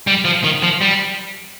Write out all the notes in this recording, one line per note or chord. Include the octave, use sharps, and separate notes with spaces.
G3
F3
D#3
F3
G3